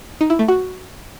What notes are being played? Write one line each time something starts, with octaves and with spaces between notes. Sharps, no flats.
D#4
E4
A3
F#4